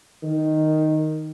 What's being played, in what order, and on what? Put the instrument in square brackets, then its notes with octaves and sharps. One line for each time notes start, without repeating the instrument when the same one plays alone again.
[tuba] D#3